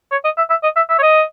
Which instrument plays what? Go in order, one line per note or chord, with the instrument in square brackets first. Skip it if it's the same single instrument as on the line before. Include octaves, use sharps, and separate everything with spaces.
[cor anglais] C#5
D#5
E5
E5
D#5
E5
E5
C#5
D#5